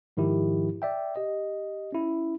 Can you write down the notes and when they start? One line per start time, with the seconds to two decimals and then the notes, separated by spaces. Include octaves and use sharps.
0.17 G#2 D#3 F3 E4 G4
0.82 D5 E5 G5
1.16 G4 D#5
1.92 C#4 E4